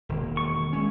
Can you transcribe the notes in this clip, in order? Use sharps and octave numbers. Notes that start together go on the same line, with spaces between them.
E1 D#3 A#3
C#6
G#3 C#4